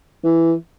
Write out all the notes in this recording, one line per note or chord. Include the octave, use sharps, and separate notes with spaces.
E3